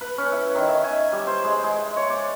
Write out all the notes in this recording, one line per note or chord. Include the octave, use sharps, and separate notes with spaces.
B4
C#4
E4
D#3
E5
G#5
G3
C5
G#3
G#3
C#5
D5